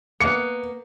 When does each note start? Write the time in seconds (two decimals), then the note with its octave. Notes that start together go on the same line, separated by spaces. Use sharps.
0.21 A#3 B3 C#7